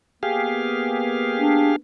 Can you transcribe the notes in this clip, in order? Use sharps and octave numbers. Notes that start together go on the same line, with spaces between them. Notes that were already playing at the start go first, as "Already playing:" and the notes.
A#3 B3 G4 G#4 F5
D4